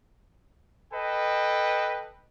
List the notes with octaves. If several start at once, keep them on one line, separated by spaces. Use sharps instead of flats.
A4 B4 D#5 G5